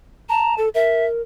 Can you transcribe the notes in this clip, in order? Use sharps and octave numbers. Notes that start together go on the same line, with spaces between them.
A5 A#5
A4
A#4 E5